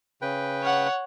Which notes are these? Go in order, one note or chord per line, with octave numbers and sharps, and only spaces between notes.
C#3 B4 G5
C#5 F#5